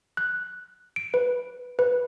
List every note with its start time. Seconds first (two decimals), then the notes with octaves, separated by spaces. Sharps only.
0.17 F#6
0.96 D7
1.14 B4
1.79 B4